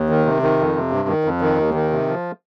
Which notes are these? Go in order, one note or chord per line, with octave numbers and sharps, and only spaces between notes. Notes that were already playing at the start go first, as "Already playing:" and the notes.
Already playing: D#2
D#3
C3
D#3
F2
C3
G2
D#3
F2
D#3
D#2
D#3
C3
F3